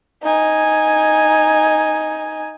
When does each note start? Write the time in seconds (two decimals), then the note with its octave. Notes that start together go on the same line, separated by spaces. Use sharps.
0.22 D#4 G#5